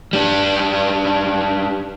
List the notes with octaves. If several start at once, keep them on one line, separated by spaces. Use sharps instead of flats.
G3 D4